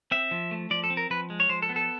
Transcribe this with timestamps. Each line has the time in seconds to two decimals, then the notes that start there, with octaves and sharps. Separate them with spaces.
0.11 C4 E5
0.31 F3
0.51 A3
0.71 F3 D5
0.84 A4
0.90 C4
0.97 A#4
1.10 F3 B4
1.30 G#3
1.40 C#5
1.49 F3 C5
1.62 A4
1.69 B3
1.76 A4